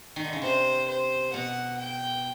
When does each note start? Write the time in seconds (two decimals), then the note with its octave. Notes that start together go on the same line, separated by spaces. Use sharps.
0.16 D#3
0.24 D3
0.33 C#3
0.42 C3 C5
0.88 C5
1.34 B2 F#5
1.79 G5